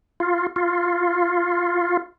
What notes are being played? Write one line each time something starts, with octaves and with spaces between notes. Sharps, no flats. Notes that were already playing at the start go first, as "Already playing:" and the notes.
F4
F4